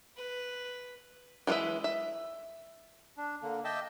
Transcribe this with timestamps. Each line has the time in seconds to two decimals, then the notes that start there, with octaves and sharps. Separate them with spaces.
0.17 B4
1.47 E3 G#3 F4 B4 E5
1.84 E5
3.17 D4
3.43 D3 A#3
3.65 D#5 E5 G5 A5 D6 E6